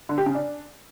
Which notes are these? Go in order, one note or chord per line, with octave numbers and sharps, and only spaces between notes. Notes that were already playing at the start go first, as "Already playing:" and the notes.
D3
G4
C#3
D4